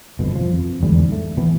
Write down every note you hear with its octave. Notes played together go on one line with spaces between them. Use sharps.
G1 F2 B2
F3
F2
E2 G#2 D3 G3
A3
B2 E3 B3